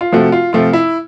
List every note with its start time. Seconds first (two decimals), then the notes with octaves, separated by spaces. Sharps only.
0.01 F4
0.12 C3 F3 A3 F#4
0.32 F4
0.53 C3 F3 A3 F4
0.73 E4